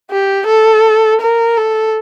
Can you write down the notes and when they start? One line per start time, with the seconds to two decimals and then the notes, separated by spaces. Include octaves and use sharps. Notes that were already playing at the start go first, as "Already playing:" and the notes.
0.11 G4
0.47 A4
1.21 A#4
1.57 A4